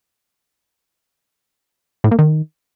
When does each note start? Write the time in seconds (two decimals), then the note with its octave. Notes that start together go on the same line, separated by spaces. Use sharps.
2.04 A2
2.11 A#2
2.19 D#3